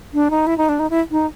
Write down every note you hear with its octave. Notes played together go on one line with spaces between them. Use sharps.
D4
D#4
E4
D#4
D4
D#4
E4
D#4